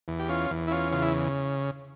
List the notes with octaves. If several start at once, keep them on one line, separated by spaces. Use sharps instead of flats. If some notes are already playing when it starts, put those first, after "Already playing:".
E2
G4
C#4 F4
E2
E4
C#4 F4
C#3 F4
E4